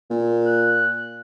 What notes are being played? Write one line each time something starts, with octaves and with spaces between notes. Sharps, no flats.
A#2
F#6